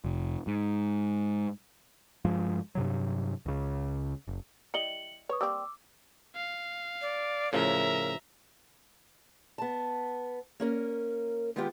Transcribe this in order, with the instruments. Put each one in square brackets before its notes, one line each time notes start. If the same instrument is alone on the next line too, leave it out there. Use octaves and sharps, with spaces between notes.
[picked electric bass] F1
G#2
G2 F3 G#3
G2 C3 F#3
C#2 C#3
F#1
[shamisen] G3 E4 D#5 [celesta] C#7 F#7 G7
[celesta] B4 C#6 D#6 [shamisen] C#5
[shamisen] G3 A#3 C4 [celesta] D6 E6
[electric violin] F5
[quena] D5
[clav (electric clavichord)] A2 C#3 F3 [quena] A#4 [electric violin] E5 A#5
[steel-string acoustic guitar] B3 A5
A#3 C#4 A#4
D#3 G#3 B3 F4 G4